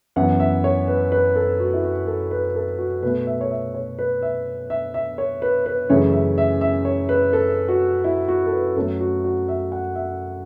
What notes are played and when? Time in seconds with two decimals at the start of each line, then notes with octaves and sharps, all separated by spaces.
0.16 F#2 E3 B3 F#5
0.40 E5
0.64 C#5
0.88 B4
1.12 B4
1.36 A4
1.60 F#4
1.74 E4
1.83 F#4
2.07 A4
2.31 B4
2.55 A4
2.79 F#4
3.03 B2 A3 B4
3.27 E5
3.41 C#5
3.51 E5
3.74 C#5
3.99 B4
4.22 E5
4.70 E5
4.94 E5
5.18 C#5
5.42 B4
5.66 B4
5.89 F#2 C#3 E3 A3 C#5
6.13 E5
6.38 E5
6.61 E5
6.85 C#5
7.09 B4
7.33 A4
7.68 F#4
8.04 E4
8.28 F#4
8.46 A4
8.52 B4
8.76 F#2 F#3 A3 A4
9.00 F#4
9.24 F#4
9.48 E5
9.72 F#5
9.96 E5